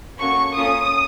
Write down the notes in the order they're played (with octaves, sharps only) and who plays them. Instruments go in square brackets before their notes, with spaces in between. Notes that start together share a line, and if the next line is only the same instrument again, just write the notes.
[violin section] A#3 C#4 F#4 A4 C#6
A#3 C#4 F4 A4 D#6